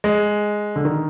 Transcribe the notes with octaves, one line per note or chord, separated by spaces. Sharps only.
G#3
D3
D#3